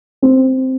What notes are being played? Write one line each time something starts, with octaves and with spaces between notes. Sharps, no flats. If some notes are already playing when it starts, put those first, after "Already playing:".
C4